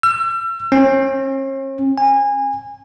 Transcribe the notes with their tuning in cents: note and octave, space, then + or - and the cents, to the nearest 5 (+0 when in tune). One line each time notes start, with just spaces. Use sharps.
E6 +40
C#4 -45
G#5 -25